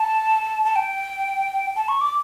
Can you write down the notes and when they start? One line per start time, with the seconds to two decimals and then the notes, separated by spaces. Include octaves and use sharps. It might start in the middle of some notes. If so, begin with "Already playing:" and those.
Already playing: A5
0.65 A5
0.76 G5
1.76 A5
1.88 C#6
2.01 D6